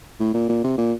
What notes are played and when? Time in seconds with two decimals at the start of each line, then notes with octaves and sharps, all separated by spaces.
0.20 A2
0.34 A#2
0.49 A#2
0.64 C3
0.78 A#2